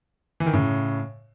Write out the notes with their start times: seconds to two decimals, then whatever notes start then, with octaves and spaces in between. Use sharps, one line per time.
0.40 E3
0.46 D#3
0.53 A2 C#3